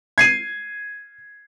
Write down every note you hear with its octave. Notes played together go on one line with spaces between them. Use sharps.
G#6 C7 D#7